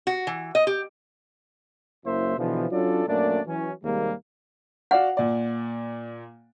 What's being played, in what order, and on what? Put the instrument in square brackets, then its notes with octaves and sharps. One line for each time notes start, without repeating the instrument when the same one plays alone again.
[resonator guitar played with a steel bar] F#4
E3
D#5
G4
[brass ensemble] F#1 F#2 A#3 E4 C5 E5
B2 D3 E3 F3
F#3 C#4 D4 F4 A4 D5
A#1 F#2 A3 A#3 D4 D5
E3 F#3 C#4
D#2 C3 G3 G#3 A#3
[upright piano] F#4 D5 F5 [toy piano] F#5
[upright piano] A#2 D5